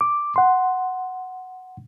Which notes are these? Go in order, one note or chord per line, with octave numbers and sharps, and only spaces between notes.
D6
F#5 C6